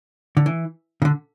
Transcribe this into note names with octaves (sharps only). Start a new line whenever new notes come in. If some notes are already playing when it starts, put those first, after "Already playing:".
D3
E3
C#3
D3